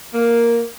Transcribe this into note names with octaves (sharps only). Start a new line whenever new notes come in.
A#3